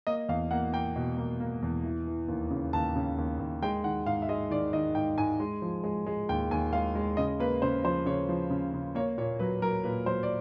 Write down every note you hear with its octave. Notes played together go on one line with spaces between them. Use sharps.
A#3 D#5
E2 F5
A#3 F#5
A#3 G5
B2
A#3
A#3
E2
E3
E3
D#2
C#3
D#2 A5
C#3
D#2
D#2
G#3 G5
D#3 F#5
G#2 F5
E5
G#3 D#5
D#3 D5
D#3 D#5
G#2 G5
G#2 G#5
G#3
F3
G#3
G#3
D#2 G5
D#2 G#5
G#3 F5
G#3
C#3 D#5
A#3 B4
C#3 C5
F3 C5
C#3 C#5
F3
C#3
C#3
A#3 C#5
A#2 C#5
F#3 B4
F#3 A#4
A#2 B4
F#3 C5
D5